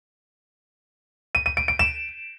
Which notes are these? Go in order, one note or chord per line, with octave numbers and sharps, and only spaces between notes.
D#7
D#7
D7
D7
E7